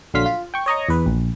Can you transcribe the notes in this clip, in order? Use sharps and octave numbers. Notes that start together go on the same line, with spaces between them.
A#1 D3 F#3 F5 C6 B6
F4
G5 C#6
C#5 D#5 A#5 C#6
E2 B4
A#1